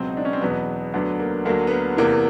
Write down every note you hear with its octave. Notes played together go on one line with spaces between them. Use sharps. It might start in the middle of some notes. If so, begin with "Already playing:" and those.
Already playing: C#2 B2 F#3 C4
D#4
D4
C#4
C4
E2 B2 F#3 B3
D2 D3 F#3 B3
A#3
D2 D3 F#3 A#3
B3
A#3
E2 C3 E3 A#3